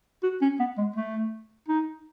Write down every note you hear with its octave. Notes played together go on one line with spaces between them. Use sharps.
F#4
C#4
B3
G#3
A3
D#4